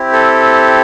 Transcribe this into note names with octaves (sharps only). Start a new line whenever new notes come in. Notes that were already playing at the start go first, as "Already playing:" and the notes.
Already playing: C4 E4 G4
A4